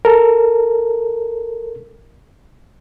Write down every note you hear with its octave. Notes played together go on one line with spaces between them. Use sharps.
A4 A#4